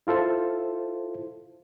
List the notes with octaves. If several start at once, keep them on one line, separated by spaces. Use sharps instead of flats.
E4 F4 A4 C5